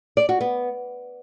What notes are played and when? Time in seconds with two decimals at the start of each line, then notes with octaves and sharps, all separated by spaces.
0.17 D5
0.29 F#4
0.41 B3